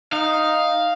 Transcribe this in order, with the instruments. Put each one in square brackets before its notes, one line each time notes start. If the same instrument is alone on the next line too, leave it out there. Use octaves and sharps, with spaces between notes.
[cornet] D#4 [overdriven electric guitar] F5